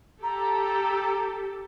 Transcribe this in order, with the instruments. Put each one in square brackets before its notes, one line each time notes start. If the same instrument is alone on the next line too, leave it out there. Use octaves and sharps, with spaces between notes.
[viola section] G4 A4 [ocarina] A#5